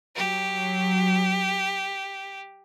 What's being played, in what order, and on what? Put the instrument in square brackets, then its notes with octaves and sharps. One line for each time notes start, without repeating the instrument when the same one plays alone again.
[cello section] F#3 [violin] G4